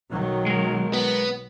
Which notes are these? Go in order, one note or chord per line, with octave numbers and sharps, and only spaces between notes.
B1 D#3 F#3
G#3 A#4
B3